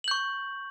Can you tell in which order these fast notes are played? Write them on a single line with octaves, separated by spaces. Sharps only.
F#7 G6 C#6